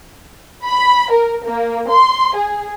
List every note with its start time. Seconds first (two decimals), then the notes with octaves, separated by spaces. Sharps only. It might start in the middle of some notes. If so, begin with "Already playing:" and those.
0.64 B5
1.11 A#4
1.44 A#3
1.90 C6
2.35 G#4